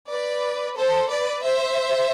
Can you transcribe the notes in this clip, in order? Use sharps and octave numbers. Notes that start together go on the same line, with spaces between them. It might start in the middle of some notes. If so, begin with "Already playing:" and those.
B4 D5
A4 C5
B4 D5
C5 E5